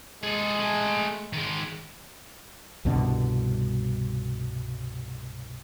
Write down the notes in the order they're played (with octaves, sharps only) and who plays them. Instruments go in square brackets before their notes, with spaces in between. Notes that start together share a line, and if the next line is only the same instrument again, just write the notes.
[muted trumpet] G#3 [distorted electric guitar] G#4 A4
[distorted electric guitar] A3 G#5
D#3 G#3
[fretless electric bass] C2 G2 B2 D3